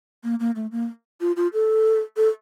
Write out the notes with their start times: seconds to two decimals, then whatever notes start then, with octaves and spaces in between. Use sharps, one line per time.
0.24 A#3
0.40 A#3
0.56 A3
0.72 A#3
1.21 F4
1.36 F4
1.53 A4
2.17 A4